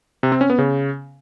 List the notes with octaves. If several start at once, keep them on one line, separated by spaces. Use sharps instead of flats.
C3
C4
C#4
B3
C#3